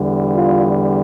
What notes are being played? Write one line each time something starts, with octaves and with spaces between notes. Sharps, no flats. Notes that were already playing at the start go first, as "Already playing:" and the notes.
Already playing: E2 D3 G3
F4